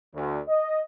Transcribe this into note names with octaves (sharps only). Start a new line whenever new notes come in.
D2
D#5